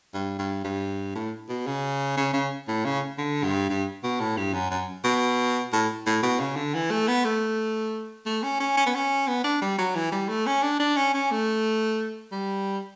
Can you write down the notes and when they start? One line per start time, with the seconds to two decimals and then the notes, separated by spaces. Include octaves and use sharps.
0.14 G2
0.39 G2
0.64 G2
1.15 A2
1.49 B2
1.67 C#3
2.17 C#3
2.33 C#3
2.68 A2
2.85 C#3
3.18 D3
3.43 G2
3.69 G2
4.04 B2
4.20 A2
4.37 G2
4.54 F#2
4.71 F#2
5.04 B2
5.73 A2
6.07 A2
6.23 B2
6.39 C#3
6.56 D3
6.74 E3
6.91 A3
7.08 B3
7.25 A3
8.26 A3
8.43 C#4
8.60 C#4
8.77 C#4
8.86 B3
8.95 C#4
9.28 B3
9.44 D4
9.62 G3
9.79 F#3
9.95 E3
10.12 G3
10.29 A3
10.46 C#4
10.63 D4
10.79 D4
10.97 C#4
11.14 C#4
11.31 A3
12.32 G3